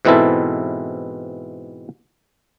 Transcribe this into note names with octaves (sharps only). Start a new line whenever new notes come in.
G#2 B2 E3 C4 E4 A4